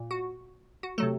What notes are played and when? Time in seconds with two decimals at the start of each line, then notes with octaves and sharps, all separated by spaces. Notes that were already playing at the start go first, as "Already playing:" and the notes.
Already playing: A#2
0.11 F#4
0.83 F#4
0.98 C3 F#3 A3 A4